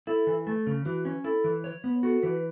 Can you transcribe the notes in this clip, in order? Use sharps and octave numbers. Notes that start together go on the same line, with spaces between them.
E4 A4
E3
A3
C#3
E3 F#4
C#4
E4 A4
E3
C#5
B3
F#4 A4
E3 B4